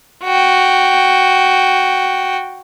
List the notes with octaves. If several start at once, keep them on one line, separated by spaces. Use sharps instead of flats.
F#4 G5